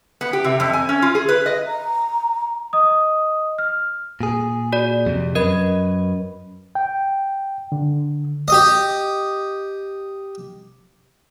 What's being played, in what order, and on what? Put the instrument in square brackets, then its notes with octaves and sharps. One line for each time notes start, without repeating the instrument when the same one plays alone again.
[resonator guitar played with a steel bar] B3
G4
C3
F2
G#5
C#4
F4
G#4
B4
D#5
[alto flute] A#5
[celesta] D#5 D#6
F6
[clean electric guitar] A#2 G#4
[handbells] F#4 D5
[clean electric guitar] F2 C3
[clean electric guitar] F#2 B4 [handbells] A#4 D#5 G#6
[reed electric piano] G5
D3
[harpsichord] G4 D#5